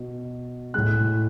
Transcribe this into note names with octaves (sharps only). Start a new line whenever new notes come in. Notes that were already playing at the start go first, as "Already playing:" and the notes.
Already playing: B2
A2 G#3 F#6